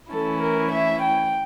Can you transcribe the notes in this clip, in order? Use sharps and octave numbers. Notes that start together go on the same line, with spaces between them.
E3 A3 C#4 E4 A4
A#4
E5
G5